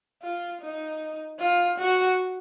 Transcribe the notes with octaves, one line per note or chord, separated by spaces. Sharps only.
F4
D#4
F4
F#4